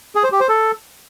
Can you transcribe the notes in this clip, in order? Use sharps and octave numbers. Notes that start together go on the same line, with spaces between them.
G#4
C5
G4
C5
A4